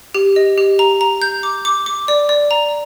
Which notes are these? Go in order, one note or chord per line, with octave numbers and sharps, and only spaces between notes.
G4
D#5
G4
A#5
A#5
G6
D6
D6
D6
D5
D5
A#5